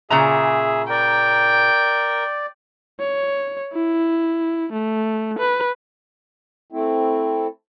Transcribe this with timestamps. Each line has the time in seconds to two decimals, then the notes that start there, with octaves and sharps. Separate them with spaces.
0.10 A#2 C#3 G#4 E5 A#5
0.90 A#4 D5 G5
3.00 C#5
3.73 E4
4.73 A3
5.39 B4
6.72 A3 C4 E4